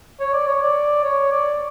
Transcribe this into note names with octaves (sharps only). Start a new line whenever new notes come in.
C#5
D5
C#5
D5
C#5
D5